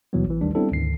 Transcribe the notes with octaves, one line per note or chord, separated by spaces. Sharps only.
D#2 B2 E3 F#3 G3 B3
A1 E3
D#2 D#3 G3 A3 D4
G3 B3 C4 D4 E4 A4
D2 G#2 D#3 C7